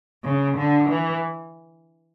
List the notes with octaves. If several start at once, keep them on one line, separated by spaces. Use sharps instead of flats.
C#3
D3
E3